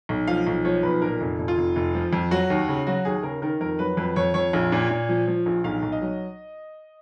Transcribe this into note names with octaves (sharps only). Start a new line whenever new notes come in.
B1
F3 F5
B1
F3 C#5
B1 B4
A#2 A#4
F1
F1
F4
F1
F1
F3
F2
F#3 F#4
D#2
C#3
F#3 F#4
D#2 G#4
C#3 A#4
D#3 A#4
F2 A#4
F#3 B4
F2 B4
F2 C#5
F2 C#5
A#1
A#2
A#2
F3
F3
A#1
B1 F5
B1
D#5
F#3